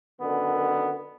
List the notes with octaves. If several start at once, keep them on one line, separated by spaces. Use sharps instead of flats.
F#2 D3 D#3 B3